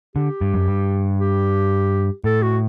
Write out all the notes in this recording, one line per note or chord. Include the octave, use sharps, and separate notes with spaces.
D3 G4
G2
F#2
G2
G4
A2 A4
F#4